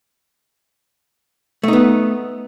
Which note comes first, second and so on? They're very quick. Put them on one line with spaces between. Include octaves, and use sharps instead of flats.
A3 D#4 B3